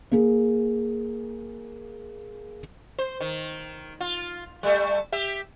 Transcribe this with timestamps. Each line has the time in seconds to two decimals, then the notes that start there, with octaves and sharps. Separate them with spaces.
0.12 A#3 G#4
2.99 C5
3.21 D#3
4.01 F4
4.63 G3 A3
5.12 G4 E5